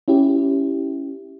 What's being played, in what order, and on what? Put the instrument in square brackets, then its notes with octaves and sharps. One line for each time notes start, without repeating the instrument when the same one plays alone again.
[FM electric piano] C#4 E4 G4